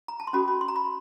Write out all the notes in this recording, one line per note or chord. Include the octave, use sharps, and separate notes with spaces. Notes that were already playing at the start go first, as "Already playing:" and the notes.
A#5
A5
C6
C#4 F#4 A4 B5
B5
C6
A#5
B5